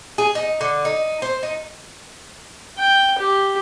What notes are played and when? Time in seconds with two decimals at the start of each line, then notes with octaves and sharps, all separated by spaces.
0.18 G#4
0.35 D#4
0.61 D3
0.85 D#4
1.22 C5
1.43 D#4
2.78 G5
3.19 G4